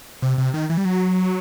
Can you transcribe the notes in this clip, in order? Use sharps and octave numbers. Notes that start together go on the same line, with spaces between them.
C3
C3
D#3
E3
G3
F#3